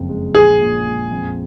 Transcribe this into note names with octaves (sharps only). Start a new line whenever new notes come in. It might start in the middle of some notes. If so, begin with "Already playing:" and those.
Already playing: F#1 F2
G#3
A#1 G#4
A#2
G#3
F2